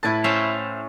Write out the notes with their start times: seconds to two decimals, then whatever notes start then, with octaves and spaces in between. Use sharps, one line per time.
0.03 A2 E4 B4 A5 A6
0.24 C#4 C5 E5 F5